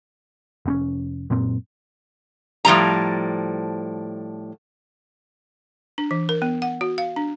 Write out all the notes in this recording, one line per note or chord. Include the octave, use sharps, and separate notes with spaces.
F1 C4 C#4
F#2 A#2 C4
A2 F3 G3 A#5
D4
E3
A#4
B3
F#5
F#4
F5
D4